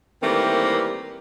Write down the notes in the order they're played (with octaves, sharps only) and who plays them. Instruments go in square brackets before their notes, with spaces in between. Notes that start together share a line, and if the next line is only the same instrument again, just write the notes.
[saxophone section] D#3 E3 G3 A3 A#3 C4